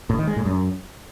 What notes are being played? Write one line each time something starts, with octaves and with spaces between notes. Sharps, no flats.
A2
D#3
G#3
A2
F#2